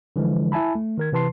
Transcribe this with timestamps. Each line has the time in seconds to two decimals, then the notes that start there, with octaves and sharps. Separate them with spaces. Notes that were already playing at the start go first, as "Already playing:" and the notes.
0.16 D3 E3 F3 G#3
0.52 E4 E5 G#5 A5 B5
0.75 A3
0.98 D#3 A#4 G#6
1.12 C3 E3 B4 A5 C6 C7